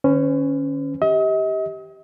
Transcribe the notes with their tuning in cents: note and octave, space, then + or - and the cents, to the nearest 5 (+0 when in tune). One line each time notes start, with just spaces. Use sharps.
D#3 -40 C#4 +0 B4 +45
G4 +0 D#5 +40